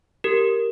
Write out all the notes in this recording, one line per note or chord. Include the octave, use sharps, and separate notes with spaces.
G4 A#4